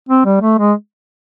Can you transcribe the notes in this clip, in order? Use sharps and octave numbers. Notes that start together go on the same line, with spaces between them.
C4
G3
A3
G#3